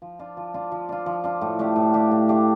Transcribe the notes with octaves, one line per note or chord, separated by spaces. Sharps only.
F3
D4 F4
F3
D4 F4
F3
D4 F4
F3
D4 F4
A2
A3 D4 G4
A2
A3 D4 G4
A2
A3 D4 G4